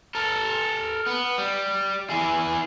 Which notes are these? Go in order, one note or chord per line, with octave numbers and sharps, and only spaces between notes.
A4 A#4
B3
G3
E3 G#4